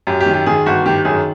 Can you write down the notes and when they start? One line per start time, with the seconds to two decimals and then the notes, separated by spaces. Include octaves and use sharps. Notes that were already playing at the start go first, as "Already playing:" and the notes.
0.07 F#2 G4
0.21 G4
0.26 D#3
0.33 G4
0.46 D#3 G#4
0.66 G1 F#4
0.86 D#3 G4
1.05 F#2 G#4